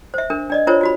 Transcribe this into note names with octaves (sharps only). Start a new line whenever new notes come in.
C5 E5
D4 A#4
D4 D5 D#5
D4 E4 F4 A#4 C5 C#5
F4 F#4 B5